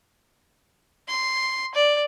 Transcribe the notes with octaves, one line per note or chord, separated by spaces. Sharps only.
C6
D5